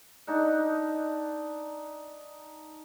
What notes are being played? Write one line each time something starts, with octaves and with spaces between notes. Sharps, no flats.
D4 D#4 F#5